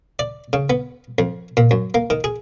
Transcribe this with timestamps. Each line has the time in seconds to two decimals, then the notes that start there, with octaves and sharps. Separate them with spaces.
0.19 D5
0.53 C#3
0.70 B3
1.18 F2
1.57 A#2
1.71 F#2
1.94 A#3
2.10 D#3
2.24 G#4